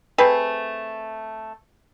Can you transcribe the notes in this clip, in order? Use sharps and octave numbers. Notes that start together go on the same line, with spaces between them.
A3 C4 G#4 B4